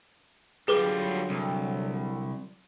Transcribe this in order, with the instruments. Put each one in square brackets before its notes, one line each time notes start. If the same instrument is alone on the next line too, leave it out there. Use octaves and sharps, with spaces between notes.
[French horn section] D3 F#3 [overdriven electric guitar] G3 F4 [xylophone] G#4 B4 D6
[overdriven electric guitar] C2